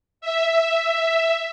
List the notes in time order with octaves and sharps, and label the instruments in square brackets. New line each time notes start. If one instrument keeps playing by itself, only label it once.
[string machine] E5